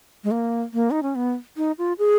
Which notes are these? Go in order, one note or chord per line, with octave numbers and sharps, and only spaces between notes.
G#3
A#3
A#3
D#4
C#4
B3
D#4
F4
G#4